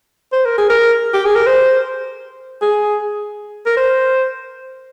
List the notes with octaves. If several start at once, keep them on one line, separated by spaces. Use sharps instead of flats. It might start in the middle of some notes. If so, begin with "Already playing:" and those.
C5
A#4
G#4
A#4
G4
G#4
A#4
C5
G#4
A#4
C5